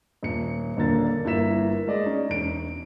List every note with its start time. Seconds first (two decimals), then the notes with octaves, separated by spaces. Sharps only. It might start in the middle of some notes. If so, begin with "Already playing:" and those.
0.23 D#1 C#7
0.77 D#1 D3 A#3 A6
1.24 G1 A#3 E4 E5 B6 E7
1.87 G#3 D5 D#5
2.06 C#4 D#4
2.29 E1 D7